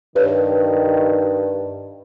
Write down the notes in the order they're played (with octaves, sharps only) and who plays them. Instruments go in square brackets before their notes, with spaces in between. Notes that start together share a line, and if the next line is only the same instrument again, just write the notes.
[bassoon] G2 [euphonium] D#3 [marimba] G4 B4 C#5